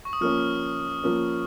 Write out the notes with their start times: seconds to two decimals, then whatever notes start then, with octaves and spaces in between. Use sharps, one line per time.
0.05 C#6
0.13 D#6
0.21 F3 A#3 C#4 F6
1.04 F3 A#3 C#4